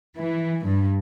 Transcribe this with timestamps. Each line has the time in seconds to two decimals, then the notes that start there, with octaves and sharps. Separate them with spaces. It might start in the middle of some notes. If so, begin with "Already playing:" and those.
0.19 E3
0.66 G2